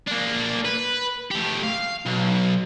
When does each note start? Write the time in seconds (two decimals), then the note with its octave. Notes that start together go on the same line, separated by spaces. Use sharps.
0.08 A#3 D4
0.65 B4
1.31 A3 G4
1.63 F5
2.06 B1